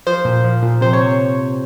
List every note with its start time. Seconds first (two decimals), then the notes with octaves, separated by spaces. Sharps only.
0.07 F3 C5
0.25 A#2
0.44 F3
0.62 A#2
0.81 C3 C5
0.93 C#5
1.00 C3